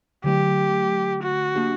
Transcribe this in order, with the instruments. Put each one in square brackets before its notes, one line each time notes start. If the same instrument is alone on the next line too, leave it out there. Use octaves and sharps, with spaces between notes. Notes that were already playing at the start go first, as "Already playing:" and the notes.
[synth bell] D3 F#3 A3 [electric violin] G4
[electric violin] F#4
[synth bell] A#3 D4 G4